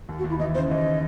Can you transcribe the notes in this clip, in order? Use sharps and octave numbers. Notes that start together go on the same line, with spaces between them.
D#2
F#4
D#2
E4
E3 D#5
C#3 C5
D#2 D#5